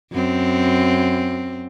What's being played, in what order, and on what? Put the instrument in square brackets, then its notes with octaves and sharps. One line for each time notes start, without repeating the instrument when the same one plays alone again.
[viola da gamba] F#2 C4